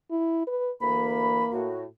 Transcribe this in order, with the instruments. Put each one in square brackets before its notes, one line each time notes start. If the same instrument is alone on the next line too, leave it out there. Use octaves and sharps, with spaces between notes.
[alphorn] E4
B4
[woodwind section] D2 E3 B5 [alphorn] A#3
[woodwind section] A2 F#4